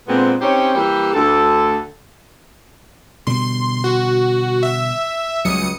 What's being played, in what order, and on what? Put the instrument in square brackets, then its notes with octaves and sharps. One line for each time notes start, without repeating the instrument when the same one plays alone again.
[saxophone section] A#2 D3 G#3 B3 C4
C4 C#4 D#4 G4 C5 C#5
E3 G3 A#3 G4
D2 A4
[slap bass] B2 D3 G3 [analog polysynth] C6
[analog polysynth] F#4
E5
[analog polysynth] C#2 D#6 C#7 [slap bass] F#3 G3